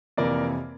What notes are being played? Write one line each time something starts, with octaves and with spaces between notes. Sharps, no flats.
F2 C3 E3 A#3 A#4 D5